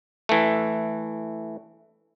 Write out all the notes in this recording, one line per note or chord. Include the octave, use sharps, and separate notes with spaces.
E3 A3